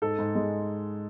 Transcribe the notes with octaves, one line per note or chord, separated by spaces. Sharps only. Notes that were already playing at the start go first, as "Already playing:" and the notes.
G#2 A4
G#2
G#3